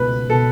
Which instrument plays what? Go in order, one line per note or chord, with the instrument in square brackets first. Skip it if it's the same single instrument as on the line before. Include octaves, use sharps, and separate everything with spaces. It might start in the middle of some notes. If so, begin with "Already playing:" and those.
Already playing: [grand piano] C#2 B2 A3 [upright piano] B4
[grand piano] B2 [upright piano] A4